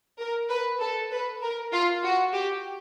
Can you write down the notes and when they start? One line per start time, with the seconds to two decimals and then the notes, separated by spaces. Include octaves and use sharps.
0.19 A#4
0.50 B4
0.80 A4
1.11 B4
1.42 A#4
1.73 F4
2.03 F#4
2.34 G4